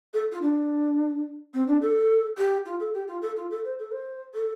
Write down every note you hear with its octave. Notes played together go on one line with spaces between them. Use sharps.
A4
F4
D4
C4
D4
A4
G4
F4
A4
G4
F4
A4
F4
A4
C5
A4
C5
A4